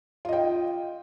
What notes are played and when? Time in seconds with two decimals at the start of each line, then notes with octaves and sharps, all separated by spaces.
0.25 F4
0.29 D#5
0.33 G5